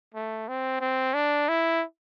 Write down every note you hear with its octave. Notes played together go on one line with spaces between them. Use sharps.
A3
C4
C4
D4
E4